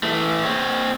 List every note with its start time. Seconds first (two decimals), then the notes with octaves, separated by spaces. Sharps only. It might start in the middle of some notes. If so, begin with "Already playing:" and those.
0.03 E3 A3
0.44 C4 C#5